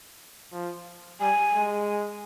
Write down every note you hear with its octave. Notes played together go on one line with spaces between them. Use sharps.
F3
G3 G#5
G#3